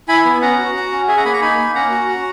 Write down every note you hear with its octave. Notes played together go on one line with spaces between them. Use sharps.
E4 G#5 B5
B3
C#4 F#5 A#5
F#4
F#4
C#4
G#4 E5 G#5
F#5 A#5
A#3 G#5 B5
A#5 C#6
D#4 G#5 B5
A#3
C#4 F#5 A#5
F#4
F#4